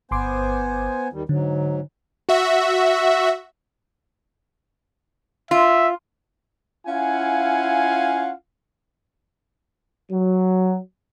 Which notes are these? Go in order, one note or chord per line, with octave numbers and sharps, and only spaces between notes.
G1 B3 C5 G#5 C6 D6
D#2 D#3 G3
G#2 D3 F#3
F#4 E5
F4 E5
C#4 E4 F4 F5 F#5 G#5
F#3